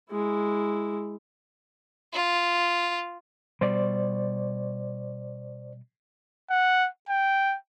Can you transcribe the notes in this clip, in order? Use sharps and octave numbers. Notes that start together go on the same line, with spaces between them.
G#3 E4
F4
B2 G3 C5 D5
F#5
G5